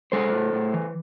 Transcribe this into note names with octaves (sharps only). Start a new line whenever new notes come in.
G#3 A4 C5
A2
A2
E3